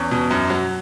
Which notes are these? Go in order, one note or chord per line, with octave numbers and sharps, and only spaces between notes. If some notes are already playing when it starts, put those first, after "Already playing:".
Already playing: E2 C#4
B2
F#2
F#3